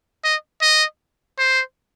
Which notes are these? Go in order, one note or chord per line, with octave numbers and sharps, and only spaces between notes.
D#5
D#5
C5